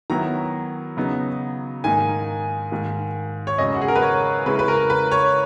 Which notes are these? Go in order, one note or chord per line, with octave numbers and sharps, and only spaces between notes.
D#3 F#3 B3 E4 A#5
C#3 F#3 B3 D#4
G#2 D#3 A#3 D#4 G#5
G#2 D#3 A#3
C#5
F#2 C#3 G#3 D#5
F#4
G#4
A#4
B4
C#5
C#3 G#3 C#4 E4 B4
B4
A#4
B4
C#5